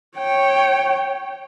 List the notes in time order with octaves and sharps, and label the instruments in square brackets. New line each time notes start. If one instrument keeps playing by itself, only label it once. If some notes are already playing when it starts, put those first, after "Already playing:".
[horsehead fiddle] C#5 G5